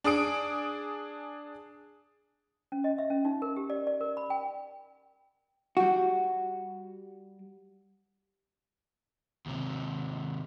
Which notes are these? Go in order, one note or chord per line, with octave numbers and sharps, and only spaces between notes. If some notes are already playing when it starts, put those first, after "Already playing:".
D4 G#4 D#6 D7
C#4
D#5
E5
C#4
D#4
A#4
G4
D5
D5
A#4
B5
G5
G3 F#4
D#2 C3